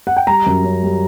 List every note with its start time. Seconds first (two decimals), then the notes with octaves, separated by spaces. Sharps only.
0.07 F#5
0.17 G5
0.27 G3 A#5
0.46 F#2
0.64 C#4
0.83 G3